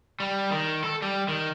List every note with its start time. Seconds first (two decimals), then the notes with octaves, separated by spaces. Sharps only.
0.20 G3
0.51 D#3
0.84 A4
1.02 G3
1.28 D#3